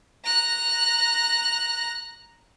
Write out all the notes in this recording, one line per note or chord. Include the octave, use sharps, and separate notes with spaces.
A#5 F#6